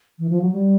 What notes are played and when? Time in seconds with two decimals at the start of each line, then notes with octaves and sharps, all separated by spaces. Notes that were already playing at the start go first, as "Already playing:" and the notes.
0.19 E3
0.30 F3
0.41 F#3
0.52 G3